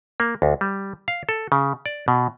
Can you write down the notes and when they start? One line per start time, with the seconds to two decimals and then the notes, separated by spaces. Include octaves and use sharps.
0.20 A#3
0.42 D2
0.61 G3
1.08 F5
1.29 A4
1.52 C#3
1.86 D5
2.08 B2